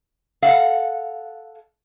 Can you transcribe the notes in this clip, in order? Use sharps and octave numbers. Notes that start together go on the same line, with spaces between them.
A4 F5 F#5